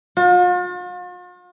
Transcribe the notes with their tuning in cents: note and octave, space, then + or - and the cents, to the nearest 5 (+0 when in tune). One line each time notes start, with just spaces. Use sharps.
F4 +45